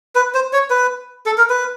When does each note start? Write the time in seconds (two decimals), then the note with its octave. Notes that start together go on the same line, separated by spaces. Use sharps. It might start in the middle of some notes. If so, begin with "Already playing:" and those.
0.15 B4
0.34 C5
0.53 C#5
0.70 B4
1.26 A4
1.38 A#4
1.50 B4